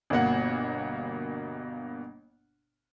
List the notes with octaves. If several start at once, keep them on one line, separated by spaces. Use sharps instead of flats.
G1 B2 A#3 F#5